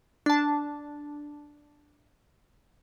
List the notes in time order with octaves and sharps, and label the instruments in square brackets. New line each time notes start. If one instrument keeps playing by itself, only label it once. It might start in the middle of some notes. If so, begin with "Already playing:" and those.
[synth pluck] D4 A5